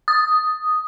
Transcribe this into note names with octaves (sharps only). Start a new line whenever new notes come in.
D#6